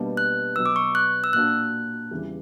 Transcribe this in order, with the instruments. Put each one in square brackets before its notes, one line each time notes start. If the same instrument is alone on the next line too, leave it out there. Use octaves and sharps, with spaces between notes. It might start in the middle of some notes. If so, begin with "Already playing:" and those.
Already playing: [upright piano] B2 G3 A#3 D4
[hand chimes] F#6
[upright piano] B2 F#3 B3 [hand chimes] E6
[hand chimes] D6
C#6
F#6
E6
[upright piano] A#2 A#3 D4 F#4 A#4 [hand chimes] F#6
[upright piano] E2 C#3 E3 G3